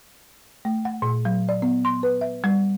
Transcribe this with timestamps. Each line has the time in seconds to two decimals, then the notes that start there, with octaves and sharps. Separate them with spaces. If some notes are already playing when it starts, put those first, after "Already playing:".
0.65 A3
0.85 F#5
1.02 A#2
1.25 F#3
1.49 D5
1.62 B3
1.85 C6
2.03 B4
2.21 E5
2.44 G3